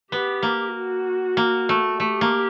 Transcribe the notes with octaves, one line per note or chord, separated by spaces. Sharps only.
B3 G4
A#3
F#4
A#3
A3
A3 G4
A#3